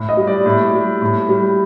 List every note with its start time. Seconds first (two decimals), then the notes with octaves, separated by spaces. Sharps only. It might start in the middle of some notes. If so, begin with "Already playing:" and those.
Already playing: A2
0.09 D#5
0.17 G3
0.27 D5
0.46 A2
0.74 G3
1.02 A2
1.29 G3